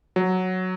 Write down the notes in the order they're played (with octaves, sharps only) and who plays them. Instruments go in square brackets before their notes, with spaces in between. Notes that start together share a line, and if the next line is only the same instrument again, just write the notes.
[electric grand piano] F#3